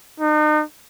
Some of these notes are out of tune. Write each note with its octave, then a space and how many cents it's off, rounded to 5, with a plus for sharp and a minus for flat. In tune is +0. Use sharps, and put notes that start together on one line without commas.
D#4 -40